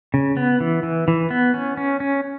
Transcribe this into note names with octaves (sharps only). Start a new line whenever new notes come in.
C#3
B3
E3
E3
E3
B3
C#4
C#4
C#4